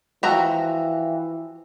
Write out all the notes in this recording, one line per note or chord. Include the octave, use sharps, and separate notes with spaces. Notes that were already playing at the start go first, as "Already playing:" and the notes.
E3 F3 F#4 F5 G5 A#5 E6